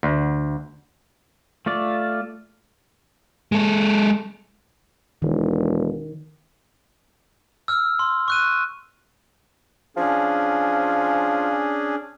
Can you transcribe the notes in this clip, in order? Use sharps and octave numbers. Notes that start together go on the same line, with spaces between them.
D2
A3 F4 D5
G#3 A4
E1 D#3
E6 F6
C6
C#6 F#6 D#7
F3 C#4 D4 G#4